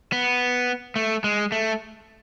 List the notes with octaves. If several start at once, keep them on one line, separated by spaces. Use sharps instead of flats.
B3
A3
G#3
A3